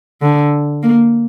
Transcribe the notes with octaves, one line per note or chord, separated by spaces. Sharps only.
D3
A#3